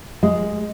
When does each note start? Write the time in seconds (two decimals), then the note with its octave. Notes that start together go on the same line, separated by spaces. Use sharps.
0.23 G#3